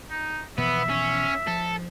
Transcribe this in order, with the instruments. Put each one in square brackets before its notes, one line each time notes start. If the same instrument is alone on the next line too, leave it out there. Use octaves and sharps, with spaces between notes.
[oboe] D#4
[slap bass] B2 E3 F3 [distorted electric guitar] B3 [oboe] E5
[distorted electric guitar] C#4
[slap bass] F3 [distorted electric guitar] A4